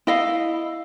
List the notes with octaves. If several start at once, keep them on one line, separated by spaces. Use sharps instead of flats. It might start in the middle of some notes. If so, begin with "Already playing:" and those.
E4 D#5 F5